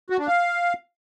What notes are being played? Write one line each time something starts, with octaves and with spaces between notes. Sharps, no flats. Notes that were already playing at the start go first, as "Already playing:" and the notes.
F#4
D4
F5